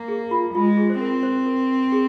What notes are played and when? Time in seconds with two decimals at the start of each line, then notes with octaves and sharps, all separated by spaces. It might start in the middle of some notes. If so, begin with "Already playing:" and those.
Already playing: A#3
0.08 G#4
0.31 F4
0.54 G#3 F4
0.77 G#4
0.90 C5
1.00 C4 A#4
1.23 C5
1.46 A#4
1.92 G#4